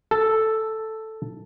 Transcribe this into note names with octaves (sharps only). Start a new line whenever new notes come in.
A4